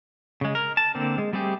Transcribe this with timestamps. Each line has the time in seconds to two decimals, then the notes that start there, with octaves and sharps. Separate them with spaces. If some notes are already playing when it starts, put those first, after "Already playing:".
0.41 C#3 G#3
0.55 A#4
0.77 A5
0.95 D3 A#3 C4
1.18 G#3
1.33 G3 A3 C4 G4 G#4